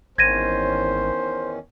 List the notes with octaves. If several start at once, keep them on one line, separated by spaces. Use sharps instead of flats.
G#1 E2 D#3 C#4 C5 G#6 A#6 D#7